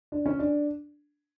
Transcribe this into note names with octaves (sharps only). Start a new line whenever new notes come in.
D4
C#4
D4